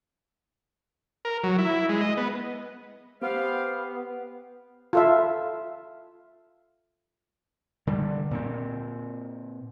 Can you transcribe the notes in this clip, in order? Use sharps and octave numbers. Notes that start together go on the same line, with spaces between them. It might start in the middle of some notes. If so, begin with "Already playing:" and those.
A#4
F#3
E4
G#3
D#5
B3
B3 G4 C5 F5
F4 A4 E5
D3 G3
A#2 C4